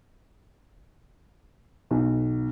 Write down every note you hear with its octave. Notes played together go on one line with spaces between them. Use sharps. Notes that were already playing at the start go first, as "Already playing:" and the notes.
B1